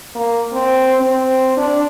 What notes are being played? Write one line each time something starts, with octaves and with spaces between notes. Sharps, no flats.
A#3
C4
C4
D4